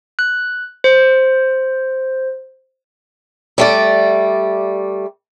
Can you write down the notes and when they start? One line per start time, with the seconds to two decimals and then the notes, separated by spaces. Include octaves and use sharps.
0.19 F#6
0.84 C5
3.58 G3 A3 D5